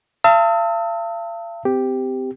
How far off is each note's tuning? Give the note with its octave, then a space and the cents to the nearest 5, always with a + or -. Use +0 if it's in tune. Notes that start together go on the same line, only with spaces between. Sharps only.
F5 -45 A5 +35 E6 -40
C4 -30 G4 +0